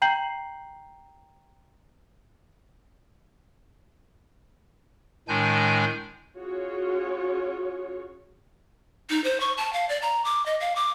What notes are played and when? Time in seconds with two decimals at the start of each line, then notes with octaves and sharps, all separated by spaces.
0.02 G5 A#5 G6 C7 F#7
5.28 A2 D#3 G#3 D4 G#5 G6
6.38 C#4 F4 F#4 G#4 C#5
9.10 D#4
9.24 C5
9.40 C#6
9.57 A5
9.73 F5
9.89 D5
10.02 A#5
10.25 D6
10.46 D#5
10.60 F5
10.76 D6